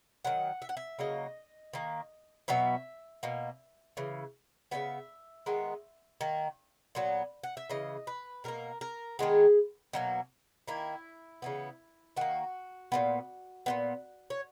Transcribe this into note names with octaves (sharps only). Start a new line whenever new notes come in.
D#3 F#3 F#5
E5
F#5
E5
C#3 F#3 A#3 D#5
D#3 A#3
B2 F#3 B3 E5
B2 A#3
C#3 E3
C#3 G#3 B3 E5
D#3 G#3 B3
D#3 A#3
A#2 F#3 B3
F#5
E5
C#3 E3 D#5
B4
B2 F#3 A#3 A#4
A#4
D#3 G#3 B3 G#4
B2 F#3 A#3
D#3 A#3 E4
C#3 E3 B3
D#3 A#3 F#4
A#2 G#3 B3
A#2 G#3 B3
C#5